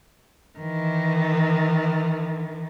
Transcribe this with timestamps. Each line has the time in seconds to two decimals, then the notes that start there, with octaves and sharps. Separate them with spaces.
0.59 D#3 E3